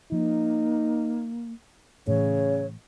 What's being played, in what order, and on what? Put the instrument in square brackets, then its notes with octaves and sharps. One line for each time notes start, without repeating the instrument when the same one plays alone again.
[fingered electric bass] F3 [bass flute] A#3 [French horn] D#4
[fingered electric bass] A2 E3 [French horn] C#3 [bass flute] C#5